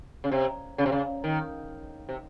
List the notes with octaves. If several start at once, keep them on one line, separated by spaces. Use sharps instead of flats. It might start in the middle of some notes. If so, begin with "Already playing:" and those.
C#3
C3
C#3
C3
C#3
D#3
C3